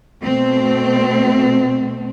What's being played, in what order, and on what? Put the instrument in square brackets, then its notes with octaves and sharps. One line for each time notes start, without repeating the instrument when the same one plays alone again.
[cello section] B2 A3 C4